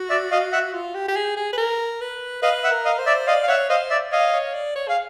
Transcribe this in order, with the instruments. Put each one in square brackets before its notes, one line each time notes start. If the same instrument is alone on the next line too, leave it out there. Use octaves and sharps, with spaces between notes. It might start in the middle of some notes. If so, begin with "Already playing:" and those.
Already playing: [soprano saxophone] F#4
[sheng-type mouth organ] D5 E5
D#5 F5
E5 F#5
[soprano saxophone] F4
G4
G4
G#4
G#4
B4
A#4
B4
[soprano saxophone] B4 [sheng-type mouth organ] D#5 F5
[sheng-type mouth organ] E5 F#5
[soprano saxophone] A#4
[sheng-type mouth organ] D#5 F5
[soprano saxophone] C5
[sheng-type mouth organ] D5 E5
[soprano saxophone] D5 [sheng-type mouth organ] D#5 F5
[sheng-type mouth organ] F5
[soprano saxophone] C#5 [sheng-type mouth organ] E5 F#5
[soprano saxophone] C5 [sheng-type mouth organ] D#5 F5
[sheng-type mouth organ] D5 E5
[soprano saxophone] C#5 [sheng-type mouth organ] D#5 F5
[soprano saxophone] C#5
D5
C#5
[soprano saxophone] G#4 [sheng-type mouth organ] F5